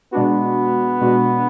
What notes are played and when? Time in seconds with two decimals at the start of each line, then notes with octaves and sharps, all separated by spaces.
0.12 B2 G#3 B3 D4 F#4
1.01 B2 G#3 D4 F#4